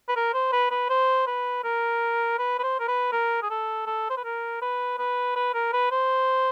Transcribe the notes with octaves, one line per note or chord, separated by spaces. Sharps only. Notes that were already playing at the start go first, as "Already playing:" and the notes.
B4
A#4
C5
B4
B4
C5
B4
A#4
B4
B4
C5
A#4
B4
A#4
G#4
A4
A4
C5
B4
A#4
B4
B4
B4
A#4
B4
C5